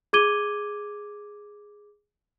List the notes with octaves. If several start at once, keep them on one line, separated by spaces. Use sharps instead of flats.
G#4 D6 G#6 D#7 G7